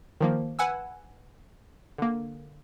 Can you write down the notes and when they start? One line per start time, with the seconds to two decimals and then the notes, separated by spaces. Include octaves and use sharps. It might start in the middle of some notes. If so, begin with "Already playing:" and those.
0.20 D#3 F3 A#3
0.59 B4 F#5 G#5 E6
1.98 D3 A#3